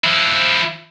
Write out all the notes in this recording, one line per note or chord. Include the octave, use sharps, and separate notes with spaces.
F3 E4